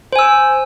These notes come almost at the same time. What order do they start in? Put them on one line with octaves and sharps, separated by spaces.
C5 G#5 E6